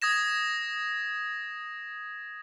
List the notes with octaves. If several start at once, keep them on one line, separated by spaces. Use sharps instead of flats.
D#6 G#6 A#6 E7